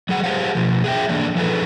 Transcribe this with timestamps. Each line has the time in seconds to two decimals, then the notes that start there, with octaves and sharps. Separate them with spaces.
0.09 F#3 G#4 F#5
0.24 G4 G#4 C5 F5 F#5
0.55 B2 F3
0.84 G#4 E5 G5
1.09 D3 E3 A#3 D4
1.36 F3 F#3 D#4 G#4 A4 B4